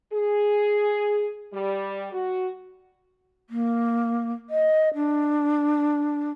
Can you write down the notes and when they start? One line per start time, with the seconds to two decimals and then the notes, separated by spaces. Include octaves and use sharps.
0.13 G#4
1.54 G3
2.13 F#4
3.50 A#3
4.50 D#5
4.95 D4